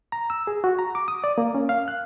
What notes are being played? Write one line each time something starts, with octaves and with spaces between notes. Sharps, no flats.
A#5
E6
G#4
F#4
A#5
D6
D#6
D5
A#3
C#4
F5
F#6